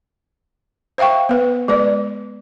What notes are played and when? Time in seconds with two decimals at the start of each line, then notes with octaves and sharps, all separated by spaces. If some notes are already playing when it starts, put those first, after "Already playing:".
0.98 C5 E5 F5 G5 C#6
1.29 B3 B4
1.68 G#3 B4 D5